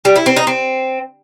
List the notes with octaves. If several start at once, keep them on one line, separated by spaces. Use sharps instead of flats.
G3
E4
C4
D#4
C4